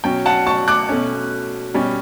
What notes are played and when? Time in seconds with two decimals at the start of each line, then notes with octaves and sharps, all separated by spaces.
0.04 B2 F#3 C#4 G5
0.26 F#5 A5
0.47 A5 C#6
0.68 D6 F#6
0.89 B2 A3 C#4
1.74 B2 G3 C#4